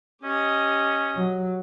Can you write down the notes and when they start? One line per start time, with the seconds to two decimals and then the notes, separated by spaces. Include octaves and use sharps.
0.23 C#4 G4 D#5
1.16 F#3